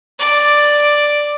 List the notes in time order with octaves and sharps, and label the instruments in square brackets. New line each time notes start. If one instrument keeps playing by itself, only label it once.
[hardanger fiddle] D5